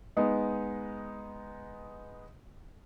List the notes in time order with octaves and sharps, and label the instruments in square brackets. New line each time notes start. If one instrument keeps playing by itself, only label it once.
[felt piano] G#3 B3 D#4